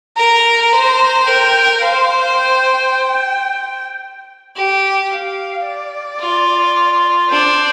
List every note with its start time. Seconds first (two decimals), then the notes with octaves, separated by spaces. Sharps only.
0.17 A#4 A#5
0.72 C5 A#5
1.26 A#4 G5
1.82 C5 F5
2.36 G5
4.56 G4
5.11 F5
5.66 D5
6.20 F4
7.30 D4 C5